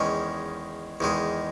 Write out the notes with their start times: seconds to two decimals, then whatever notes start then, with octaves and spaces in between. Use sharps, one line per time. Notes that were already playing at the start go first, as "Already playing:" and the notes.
Already playing: E2 D#3 G#3 C#4
1.00 E2 D#3 G#3